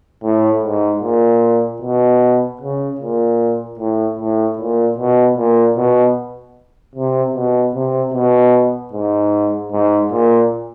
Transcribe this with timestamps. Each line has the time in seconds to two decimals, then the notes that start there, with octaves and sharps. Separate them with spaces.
0.24 A2
0.63 G#2
1.03 A#2
1.82 B2
2.61 C#3
3.00 A#2
3.79 A2
4.19 A2
4.58 A#2
4.98 B2
5.37 A#2
5.77 B2
6.95 C3
7.35 B2
7.75 C3
8.14 B2
8.93 G#2
9.72 G#2
10.12 A#2